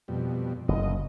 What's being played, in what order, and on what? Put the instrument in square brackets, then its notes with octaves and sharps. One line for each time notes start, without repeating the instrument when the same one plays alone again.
[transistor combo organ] F2 B2 G3
[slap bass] F#1 [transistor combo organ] D#5